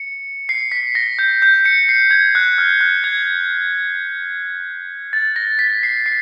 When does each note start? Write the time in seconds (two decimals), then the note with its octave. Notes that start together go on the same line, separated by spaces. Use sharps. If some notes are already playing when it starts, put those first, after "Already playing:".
Already playing: C#7
0.49 C7
0.72 B6
0.95 A#6
1.19 G6
1.42 G6
1.65 C#7
1.89 C7
2.11 G#6
2.35 F#6
2.58 F6
2.81 F#6
3.04 G#6
5.13 A6
5.36 A#6
5.59 B6
5.83 C7
6.06 C7